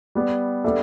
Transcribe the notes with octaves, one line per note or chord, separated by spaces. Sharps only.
G3 B3 G4 D5
G3 B3 D4 A4 E5